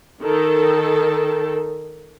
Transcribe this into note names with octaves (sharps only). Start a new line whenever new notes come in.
D#3 A4